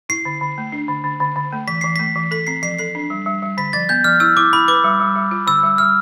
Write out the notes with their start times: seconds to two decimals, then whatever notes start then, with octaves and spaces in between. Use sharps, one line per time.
0.09 E4 C7
0.25 D3
0.41 D3
0.58 A3
0.72 D4
0.88 D3
1.04 D3
1.20 D3
1.36 D3
1.52 A3
1.68 E3 B6
1.81 E3 C7
1.96 A3 B6
2.16 E3
2.31 A4 B6
2.47 C4 C7
2.63 F3 C7
2.79 A4 C7
2.95 D4
3.10 G3
3.26 G3
3.42 G3
3.57 D3 B6
3.73 F3 A6
3.89 B3 G6
4.04 F3 F6
4.20 E4 E6
4.37 E4 D6
4.53 E4 B5
4.68 B4 D6
4.84 G3
5.00 G3
5.16 G3
5.31 F4
5.47 D3 E6
5.63 G3
5.78 G3 F6